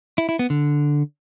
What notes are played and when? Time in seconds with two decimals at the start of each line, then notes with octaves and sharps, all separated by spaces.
0.18 E4
0.29 E4
0.39 B3
0.50 D3